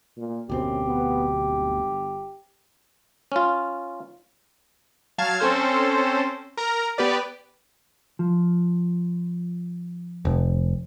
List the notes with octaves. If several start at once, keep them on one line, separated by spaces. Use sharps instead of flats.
A#2
D1 F#2 B2 C4 G4
B3
G1
C#4 F4
F#3 F5 A5 F6 G#6
C4 C#4 A4 C5
A#4 A#5
B3 G4 B4 D5
F3
F1